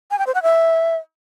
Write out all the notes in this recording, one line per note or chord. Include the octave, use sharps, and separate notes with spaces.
G#5
G5
C5
F#5
E5